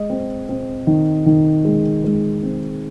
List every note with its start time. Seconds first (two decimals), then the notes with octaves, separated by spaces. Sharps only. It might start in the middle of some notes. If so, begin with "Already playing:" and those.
Already playing: G#3 D#5
0.10 C4
0.49 C4
0.87 D#3
1.26 D#3
1.65 G#3
2.04 G#3
2.43 C4